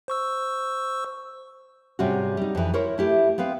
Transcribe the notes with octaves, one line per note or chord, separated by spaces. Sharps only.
C5 C#6 E6
G#2 C3 G3 C#4 F#4
G3 D#4
F2 E3
E4 A#4 C5 C#5
A3 E4 G4
B3 C4 B4 F5